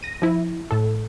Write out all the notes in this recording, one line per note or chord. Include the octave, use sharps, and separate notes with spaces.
A#6 D#7
F3 E4
A2 A4